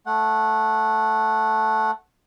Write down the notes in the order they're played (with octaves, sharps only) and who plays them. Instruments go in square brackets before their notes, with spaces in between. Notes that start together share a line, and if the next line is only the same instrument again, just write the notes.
[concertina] A3 F#5